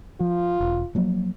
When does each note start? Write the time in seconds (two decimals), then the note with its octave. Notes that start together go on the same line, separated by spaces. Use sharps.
0.20 F3 F4
0.60 E1
0.95 F3 F#3 A#3